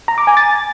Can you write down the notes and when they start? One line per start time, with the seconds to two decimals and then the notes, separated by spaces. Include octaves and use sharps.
0.08 A#5
0.18 D6
0.27 G#5
0.37 A6